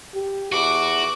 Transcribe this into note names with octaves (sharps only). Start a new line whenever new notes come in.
G4
E2 F#4 D6